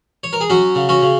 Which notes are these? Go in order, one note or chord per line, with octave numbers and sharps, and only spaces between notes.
C#5
A#4
G#4
F#3 C#4 F#4
C#3
C#4 F#4
C#3